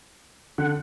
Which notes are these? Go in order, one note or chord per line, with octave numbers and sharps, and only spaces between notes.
D3 F#5